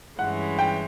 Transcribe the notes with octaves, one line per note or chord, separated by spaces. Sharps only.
G2 E3 G#3 C#4 E4 F#5
G5